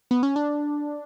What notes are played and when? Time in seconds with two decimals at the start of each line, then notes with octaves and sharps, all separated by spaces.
0.11 B3
0.23 C#4
0.36 D4